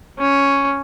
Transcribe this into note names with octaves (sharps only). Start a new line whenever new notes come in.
C#4